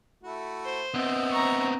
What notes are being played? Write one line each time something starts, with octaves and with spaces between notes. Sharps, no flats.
A3 E4 F#4
C5
B3 C4 D#5 E5 F#5
A#5 C#6